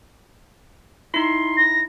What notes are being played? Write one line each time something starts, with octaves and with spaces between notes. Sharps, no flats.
D#4 E4 C6
A#6